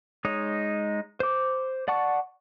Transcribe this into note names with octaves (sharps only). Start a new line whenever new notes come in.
G#3 D#4 C#5 D#6
C5 D6
D5 F#5 A5 C#6